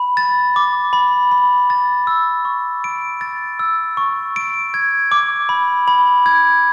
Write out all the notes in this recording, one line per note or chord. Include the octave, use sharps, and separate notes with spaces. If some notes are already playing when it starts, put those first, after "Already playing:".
Already playing: B5
A6
D6
B5
B5
A6
E6
C#6
D7
A6
E6
C#6
D7
G#6
D6
B5
B5
G#6